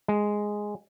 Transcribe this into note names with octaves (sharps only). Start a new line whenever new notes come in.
G#3